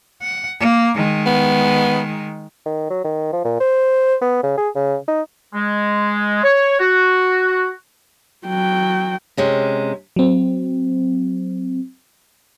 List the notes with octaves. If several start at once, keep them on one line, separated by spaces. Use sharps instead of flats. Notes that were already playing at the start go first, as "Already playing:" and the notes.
F#5
A#3
D#3 G#3
B3
D#3
F#3
D#3
F3
A#2
C5
B3
C#3
G#4
C#3
D#4
G#3
C#5
F#4
F#3 G5
C3 G#3 C#4
F#3 C4